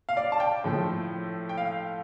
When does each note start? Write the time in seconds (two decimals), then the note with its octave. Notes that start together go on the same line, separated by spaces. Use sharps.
0.09 F5
0.17 D5
0.32 A5
0.40 G5
0.64 A2 F3 A3
1.49 G5
1.58 F5